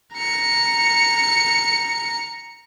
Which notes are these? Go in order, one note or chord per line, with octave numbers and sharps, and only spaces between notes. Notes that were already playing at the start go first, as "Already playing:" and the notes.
A#5 C#7